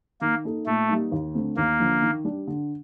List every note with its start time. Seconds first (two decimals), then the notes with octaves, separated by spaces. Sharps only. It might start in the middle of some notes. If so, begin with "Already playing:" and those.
0.21 D#3 A#3
0.44 A#3 D#4 A4
0.66 A#2 A3
0.89 G3 A#3 D#4
1.12 D#2
1.34 D3 A3 C4
1.57 D#2 A#3
1.79 D3 F3
2.02 D#3
2.24 G3 D4 G4
2.47 D3